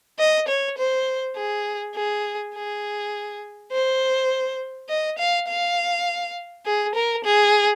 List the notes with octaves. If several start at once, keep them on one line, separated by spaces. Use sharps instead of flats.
D#5
C#5
C5
G#4
G#4
G#4
C5
D#5
F5
F5
G#4
A#4
G#4